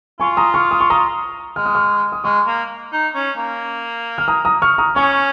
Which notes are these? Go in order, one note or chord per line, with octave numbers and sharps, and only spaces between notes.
F4 G#5 C#6
A#5 D#6
C#6 F6
D#6
C#6
A#5 D#6
G#3 F6
D#6
C#6 F6
D#6
G#3 C#6 F6
A#3
D#4
C#4
A#3
F6
A#5 D#6
A#5 D#6
C#6 F6
A#5 D#6
C#4 G#5 C#6